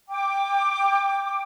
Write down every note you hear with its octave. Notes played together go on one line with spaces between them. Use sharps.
G5 D6